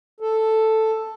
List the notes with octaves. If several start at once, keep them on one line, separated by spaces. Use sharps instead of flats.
A4